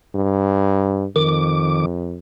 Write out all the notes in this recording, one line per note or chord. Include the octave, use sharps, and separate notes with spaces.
G2
F2 D#3 D6